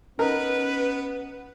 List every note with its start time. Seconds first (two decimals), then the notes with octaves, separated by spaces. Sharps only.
0.19 B3 C#4 D#4 A#4 B4 A#5